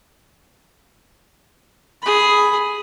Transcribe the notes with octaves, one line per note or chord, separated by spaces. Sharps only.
G#4 B5